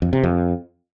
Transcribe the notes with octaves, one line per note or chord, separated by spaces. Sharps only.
F2
C3
F2